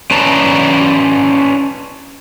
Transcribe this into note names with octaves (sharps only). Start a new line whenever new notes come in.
C#4 B4 D5 A5 A#5